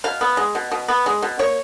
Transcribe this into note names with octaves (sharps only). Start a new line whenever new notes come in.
B2 F5
B3
G#3
B2
B2
B3
G#3
B2
A#3 C#5